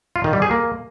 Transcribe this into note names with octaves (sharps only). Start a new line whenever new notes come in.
F4
D#3
G3
G#4
A#3